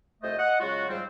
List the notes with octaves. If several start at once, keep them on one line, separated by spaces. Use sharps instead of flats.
C2 F2 A3 C5 D#5
D#5 F#5
C#3 F#3 G#3 F4 F#4
G#2 F3 G3 G#3 C4